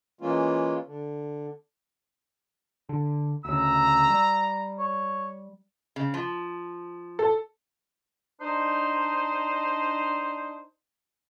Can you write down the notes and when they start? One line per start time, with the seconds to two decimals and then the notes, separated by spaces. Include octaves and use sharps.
0.21 E3 G#3 A#3 C#4 F4
0.86 D3
2.89 D3
3.45 D2 C#3 A#5 E6
4.10 G3
4.79 C#5
5.96 C#3
6.14 F3
7.19 A4
8.40 D4 D#4 C5